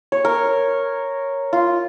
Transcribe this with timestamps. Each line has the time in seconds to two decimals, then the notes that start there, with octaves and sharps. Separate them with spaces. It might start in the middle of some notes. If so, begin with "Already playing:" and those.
0.12 C#5
0.25 A#4
1.53 F4